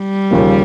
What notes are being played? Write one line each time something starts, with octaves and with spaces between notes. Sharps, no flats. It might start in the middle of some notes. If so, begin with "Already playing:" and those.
Already playing: G3
D#2 C#3 F3 A#3